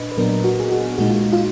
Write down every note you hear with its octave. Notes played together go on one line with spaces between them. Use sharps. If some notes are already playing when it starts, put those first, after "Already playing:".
Already playing: A#2 D4 B4 D#5
B4
A#2 F#3 B3 D4 A#4
F#4
G#4
F#4
A#2 G#3 D#4 F#4
F4
F4